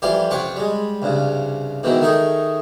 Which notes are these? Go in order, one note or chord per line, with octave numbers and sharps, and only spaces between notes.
F2 E3 G3 G4 F5 C6
F2 C3 C#4 F#5 D6
G3 G#3
C2 G2 C#3
G#2 B2 D#3 E3 C4
D#3 A3 D#4 G#4